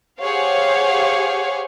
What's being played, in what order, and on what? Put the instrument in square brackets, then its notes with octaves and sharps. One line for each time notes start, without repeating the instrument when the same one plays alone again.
[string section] G4 G#4 C5 C#5 F5 F#5